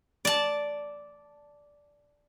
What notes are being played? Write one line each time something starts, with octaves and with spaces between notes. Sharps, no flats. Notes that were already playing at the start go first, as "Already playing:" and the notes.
D5 A5